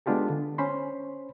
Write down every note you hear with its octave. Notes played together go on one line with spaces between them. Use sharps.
G#3 B3 D4 F4 G4 A4
D3
C#4 C5 B5 C6